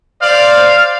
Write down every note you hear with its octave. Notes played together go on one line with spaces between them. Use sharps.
C5 D5 F5